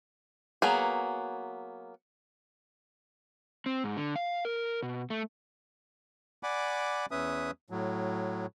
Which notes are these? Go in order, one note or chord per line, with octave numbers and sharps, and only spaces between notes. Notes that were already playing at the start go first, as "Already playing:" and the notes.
F#3 A#3 B3 G#4
C4
G#2
D3
F5
A#4
B2
A3
D5 F#5 G#5 B5 D6
E2 C#4 B4 E5 D#6
A2 F#3